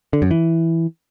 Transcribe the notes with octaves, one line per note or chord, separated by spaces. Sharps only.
D3
F#2
E3